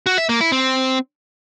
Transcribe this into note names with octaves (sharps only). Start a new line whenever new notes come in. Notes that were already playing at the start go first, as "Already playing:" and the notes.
F#4
E5
A#3
E4
C4